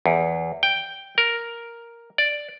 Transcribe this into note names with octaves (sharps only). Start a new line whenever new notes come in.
E2
G5
A#4
D5